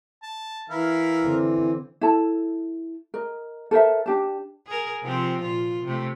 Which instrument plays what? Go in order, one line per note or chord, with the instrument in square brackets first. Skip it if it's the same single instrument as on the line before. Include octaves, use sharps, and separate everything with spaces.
[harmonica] A5
[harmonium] E3 [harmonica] E4 A#4 F5
[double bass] D3 C4
[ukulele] E4 A4 A5
A#4 D#5
A4 A#4 C5 E5
D4 G4 A5
[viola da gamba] G#4 A#4
C3 F3 C4
A#2 F4
C3 A3